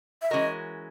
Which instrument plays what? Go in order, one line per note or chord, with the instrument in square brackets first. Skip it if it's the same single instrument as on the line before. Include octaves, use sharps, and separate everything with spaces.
[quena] E5
[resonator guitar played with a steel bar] E3 G#3 C#4 F#4 A#4 [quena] D#5